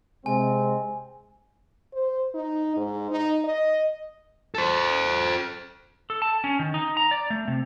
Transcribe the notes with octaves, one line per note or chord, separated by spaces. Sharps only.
C3 G#3 C4 G#5
C5
D#4
G#2
D#4
D#5
A4 C5
A4
A5
C#4
D#3
D#4
A#5
D5
A3
C3